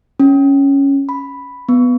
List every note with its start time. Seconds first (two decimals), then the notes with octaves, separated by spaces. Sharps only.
0.20 C#4
1.09 B5
1.69 B3